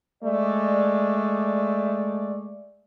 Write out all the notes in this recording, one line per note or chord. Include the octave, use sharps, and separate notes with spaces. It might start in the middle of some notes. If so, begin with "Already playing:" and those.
G#3 A3 D5